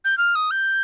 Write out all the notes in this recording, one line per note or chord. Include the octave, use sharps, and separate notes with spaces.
G6
F6
D#6
G6